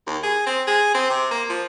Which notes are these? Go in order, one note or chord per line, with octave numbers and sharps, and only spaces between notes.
D#2
G#4
C4
G#4
C4
C3
A#3
F3